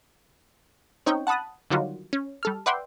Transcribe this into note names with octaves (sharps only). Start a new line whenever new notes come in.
C4 C#4 D#4 C#5 G5
F#5 A5 B5 D#6 F#6
D3 D#3 F#3 G3 F4 F#4
C#4
G3 A4 F6
B4 D5 E5 F#5 G5 C6